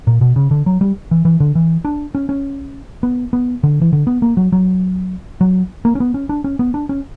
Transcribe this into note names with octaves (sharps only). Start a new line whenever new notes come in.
A#2
B2
C#3
D3
F#3
G3
E3
E3
D3
E3
D4
C#4
C#4
B3
B3
D3
E3
D3
B3
A#3
F#3
F#3
F#3
A#3
C#4
B3
C#4
D4
C#4
B3
D4
C#4